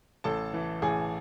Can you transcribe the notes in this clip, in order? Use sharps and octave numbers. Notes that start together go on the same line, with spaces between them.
A1 A4 A5
E3
A1 G#4 G#5